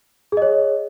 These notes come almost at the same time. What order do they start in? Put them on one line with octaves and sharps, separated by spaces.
G#4 D#5 C#5